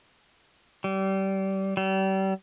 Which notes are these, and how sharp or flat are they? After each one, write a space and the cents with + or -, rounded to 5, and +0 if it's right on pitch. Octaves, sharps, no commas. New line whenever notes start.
G3 -25
G3 -35